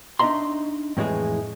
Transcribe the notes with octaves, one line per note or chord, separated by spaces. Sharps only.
D4 D#4 D#5 E5 A#5 C6
F2 A2 E3 G#3 G#4